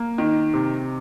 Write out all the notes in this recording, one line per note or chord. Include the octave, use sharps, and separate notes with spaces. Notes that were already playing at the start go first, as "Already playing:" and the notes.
Already playing: A#3
D#3
C3